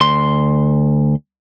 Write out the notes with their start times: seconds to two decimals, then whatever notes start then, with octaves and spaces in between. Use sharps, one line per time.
0.01 D2 C6